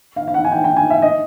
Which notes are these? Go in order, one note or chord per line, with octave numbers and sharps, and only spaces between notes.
F5
F5
F#5
G#5
G5
G5
G#5
E5
D#5